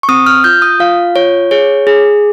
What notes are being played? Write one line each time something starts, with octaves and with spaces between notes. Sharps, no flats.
C#6
C4 D#6
F6
F4 G6
D#6
F4 F5
F4 C#5
G#4 C#5
G#4